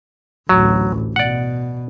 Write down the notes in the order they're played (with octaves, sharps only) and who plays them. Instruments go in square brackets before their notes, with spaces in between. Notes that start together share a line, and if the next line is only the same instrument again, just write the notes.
[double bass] A1 D2 [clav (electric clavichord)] F#3
[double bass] B2 [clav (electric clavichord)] D5 F#5